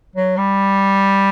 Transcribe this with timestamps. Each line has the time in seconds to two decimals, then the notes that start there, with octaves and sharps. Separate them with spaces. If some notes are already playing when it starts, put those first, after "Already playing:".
0.16 F#3
0.37 G3